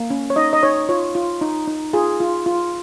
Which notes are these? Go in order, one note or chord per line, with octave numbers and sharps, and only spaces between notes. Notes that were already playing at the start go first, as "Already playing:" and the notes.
Already playing: A#3
C#4
C#5
D#4 D#5
D#5
D#4 C#5
F4 C#5
F4
D#4
D#4
F4 G#4
F4
F4